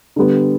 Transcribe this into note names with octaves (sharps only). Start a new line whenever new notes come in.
D3 G3 B3